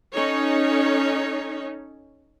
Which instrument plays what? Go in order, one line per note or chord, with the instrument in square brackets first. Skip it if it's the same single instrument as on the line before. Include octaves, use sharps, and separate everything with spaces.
[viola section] C#4 D#4 A4 C#5